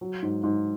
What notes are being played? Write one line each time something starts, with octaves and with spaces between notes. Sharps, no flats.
F#3
G#2
G#2